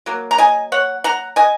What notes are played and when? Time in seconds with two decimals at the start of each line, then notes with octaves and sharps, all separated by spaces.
0.06 F#3 A#3
0.31 A#5
0.38 D#5 G#5
0.72 C#5 F#5
1.04 F#5 A#5
1.36 D#5 G#5